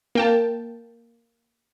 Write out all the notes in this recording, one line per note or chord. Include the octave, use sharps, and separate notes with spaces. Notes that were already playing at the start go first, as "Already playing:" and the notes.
A#3 G5 A5